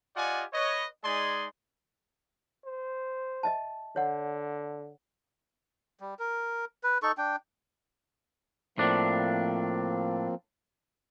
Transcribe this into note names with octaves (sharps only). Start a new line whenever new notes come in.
F4 G4 D5 D#5 F#5 G#5
B4 C#5 D#5
G#3 D#4 G#4 D5 G#5 C6
C5
D#5 E5 A5
D3 C#5 F#5
G3
A#4
B4
D#4 A4 C#6
D4 G5
A2 F3 A#3 C4 D4